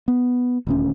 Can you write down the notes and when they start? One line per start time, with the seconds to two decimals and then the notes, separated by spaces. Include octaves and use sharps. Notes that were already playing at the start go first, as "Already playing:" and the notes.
0.08 B3
0.67 D#1 D2 C#4